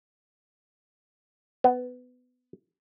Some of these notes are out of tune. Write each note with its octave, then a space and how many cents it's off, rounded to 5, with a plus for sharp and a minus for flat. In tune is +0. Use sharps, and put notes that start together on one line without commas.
B3 +20